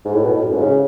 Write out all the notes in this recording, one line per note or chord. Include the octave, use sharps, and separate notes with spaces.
G#2
A2
B2
A2
F#2
G#2
C#3